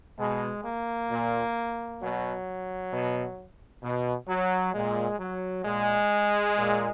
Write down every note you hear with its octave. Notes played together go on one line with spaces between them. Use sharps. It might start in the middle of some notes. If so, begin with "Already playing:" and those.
B2 G#3
A#3
A#2
B2 F#3
B2
B2
F#3
A#2 G#3
F#3
A#2 G#3
A#2